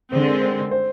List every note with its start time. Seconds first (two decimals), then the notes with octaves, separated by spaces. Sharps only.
0.11 D3 G#3 C4 C5
0.27 A#4
0.41 C5
0.71 C5